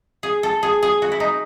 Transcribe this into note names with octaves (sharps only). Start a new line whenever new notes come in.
G#4
A4
G#4
G#4
F#4
E4
D#4